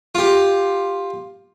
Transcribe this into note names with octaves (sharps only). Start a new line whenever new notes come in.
F4 G4